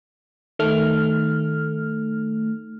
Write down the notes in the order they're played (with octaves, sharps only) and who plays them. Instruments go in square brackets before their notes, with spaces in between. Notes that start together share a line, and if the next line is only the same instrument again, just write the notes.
[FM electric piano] D#3 A3 F6